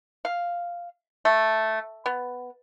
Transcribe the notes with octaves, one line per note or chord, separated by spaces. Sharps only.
F5
A3
B3